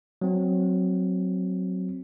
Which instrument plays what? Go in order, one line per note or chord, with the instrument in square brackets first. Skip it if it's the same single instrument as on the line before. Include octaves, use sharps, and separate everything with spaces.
[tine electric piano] F#3 C4